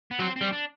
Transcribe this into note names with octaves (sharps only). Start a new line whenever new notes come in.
B3
F#3 C4
C4
G3
D4